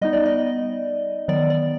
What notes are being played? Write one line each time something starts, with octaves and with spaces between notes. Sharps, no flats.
G3 B3 D#4 D#5
D5
D#5
D#3 F#3 B3 D5
D5